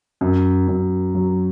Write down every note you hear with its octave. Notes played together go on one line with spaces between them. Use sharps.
F#2
F#2
F#3